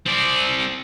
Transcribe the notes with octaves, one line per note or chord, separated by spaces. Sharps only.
C4 D5